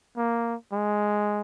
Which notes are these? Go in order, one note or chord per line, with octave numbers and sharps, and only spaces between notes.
A#3
G#3